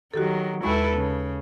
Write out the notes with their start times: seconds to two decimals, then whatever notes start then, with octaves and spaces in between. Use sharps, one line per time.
0.14 D#3 F#3 F#4 G4 A4
0.63 D#2 G#3 E4 A4 B4 C#6
0.96 C#3